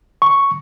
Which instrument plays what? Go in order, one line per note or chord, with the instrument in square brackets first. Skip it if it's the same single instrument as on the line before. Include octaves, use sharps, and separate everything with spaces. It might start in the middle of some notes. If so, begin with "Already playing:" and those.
[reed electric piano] C#6